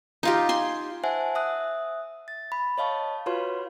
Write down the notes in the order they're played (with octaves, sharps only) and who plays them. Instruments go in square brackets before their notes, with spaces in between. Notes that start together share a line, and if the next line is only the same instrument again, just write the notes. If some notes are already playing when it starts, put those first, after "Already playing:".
[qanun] D#4 F4 G4
G#5 C6
[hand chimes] C5 E5 F#5 G#5 A5
E5 D#6 F#6
A6
B5
C#5 D#5 F5 A5 C#6
F4 F#4 B4 C#5 F5 C6